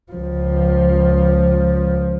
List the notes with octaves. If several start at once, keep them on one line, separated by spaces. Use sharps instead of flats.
C#2 F3